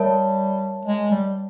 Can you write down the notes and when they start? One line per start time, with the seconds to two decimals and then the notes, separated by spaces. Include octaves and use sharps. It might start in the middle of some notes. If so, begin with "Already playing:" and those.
Already playing: G3 A#4 C#5 E5 A5
0.85 G#3
1.11 G3